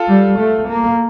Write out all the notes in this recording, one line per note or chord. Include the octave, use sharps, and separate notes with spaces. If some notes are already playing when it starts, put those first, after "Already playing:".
Already playing: F4 A4
G3
A3
A#3